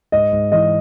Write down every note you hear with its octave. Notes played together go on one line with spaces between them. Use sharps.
G#2 D#5
G#2
E3 D#5